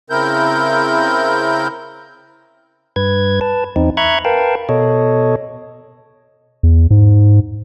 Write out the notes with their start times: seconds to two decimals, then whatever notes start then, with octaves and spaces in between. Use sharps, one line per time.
0.10 C#3 C4 E4 A#4 G6
2.96 G2 B4 G#6
3.41 B4 A5
3.76 E2 C4 D#4
3.97 E5 A#5 B5 C#6 F#6 G#6
4.25 A#4 B4 F5 G5 A5
4.69 B2 A4 C#5 D#5
6.63 E2
6.91 G#2